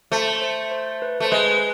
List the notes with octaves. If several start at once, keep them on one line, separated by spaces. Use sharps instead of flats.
A3 C5
C5
C5
B4
A3 C5
G#3 B4
B4